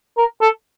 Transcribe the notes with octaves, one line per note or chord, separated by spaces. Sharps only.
A#4
A4